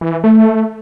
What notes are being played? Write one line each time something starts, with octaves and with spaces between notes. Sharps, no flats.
E3
A3